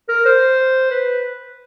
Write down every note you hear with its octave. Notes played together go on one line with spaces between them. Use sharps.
A#4
C5
B4